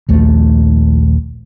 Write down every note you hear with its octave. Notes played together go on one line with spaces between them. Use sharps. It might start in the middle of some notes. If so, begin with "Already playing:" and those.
A#1 D#2 A3